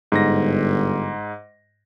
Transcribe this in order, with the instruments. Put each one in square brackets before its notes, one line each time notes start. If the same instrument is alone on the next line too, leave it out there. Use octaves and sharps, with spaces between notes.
[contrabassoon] G1 [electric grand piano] G#2 A#6